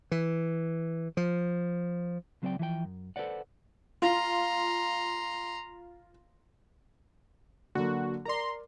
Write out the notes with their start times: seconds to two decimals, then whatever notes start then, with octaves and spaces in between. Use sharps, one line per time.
0.11 E3
1.17 F3
2.42 C#2 F#3 C4 B4 D5 G5
2.59 E3 F3 G#4 G5
2.85 F#2
3.16 A4 B4 C5 D5 F#5
4.02 F4 A#5 C6
7.75 D3 F#3 A#3 F#4
8.25 A#4 D5 A#5 C6